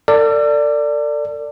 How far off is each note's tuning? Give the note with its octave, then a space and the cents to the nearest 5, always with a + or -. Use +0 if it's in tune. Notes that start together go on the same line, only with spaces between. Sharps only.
A4 +40 D5 +0